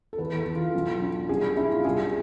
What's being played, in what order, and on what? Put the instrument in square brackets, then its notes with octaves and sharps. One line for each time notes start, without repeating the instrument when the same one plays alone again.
[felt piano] A4
E2 B4
A4
E2
F4
B1
D4
C2 G#4
D4 E4
F4
C2 G#4